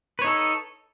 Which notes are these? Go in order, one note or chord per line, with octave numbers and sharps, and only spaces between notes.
D#4 A4 B4 C#5